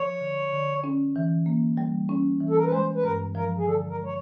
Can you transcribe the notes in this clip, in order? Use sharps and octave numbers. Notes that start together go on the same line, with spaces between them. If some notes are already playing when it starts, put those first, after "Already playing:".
Already playing: F3 C#5
D3
D3
C#4
E3
A#3
G3
C#4
E3
A4
A#4
B4
G#3 C5
B4
G2 A#4
F3 A#4
G#4
D3 A4
A#4
G#3
C#5